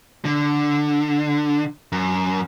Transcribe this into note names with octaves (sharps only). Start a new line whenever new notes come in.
D3
F#2